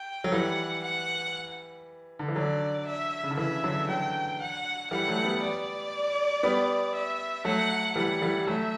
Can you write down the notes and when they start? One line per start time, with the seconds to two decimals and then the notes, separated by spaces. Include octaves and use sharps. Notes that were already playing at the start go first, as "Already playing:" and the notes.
Already playing: G5
0.24 F#3
0.32 E3 G3 F#5
0.83 F#5
2.19 D3
2.28 E3
2.36 D3 F#3 D5
2.87 E5
3.23 C#3
3.31 D3
3.37 C#3 E3 E5
3.64 D3 F#3
3.89 D3 F#3 G5
4.40 F#5
4.90 E3 G3 F#5
5.08 F#3 A3
5.24 G3 B3
5.42 D5
6.43 G3 B3
6.94 E5
7.45 F#3 A3 F#5
7.96 E3 G3 F#5
8.21 E3 G3
8.47 F#3 A3 E5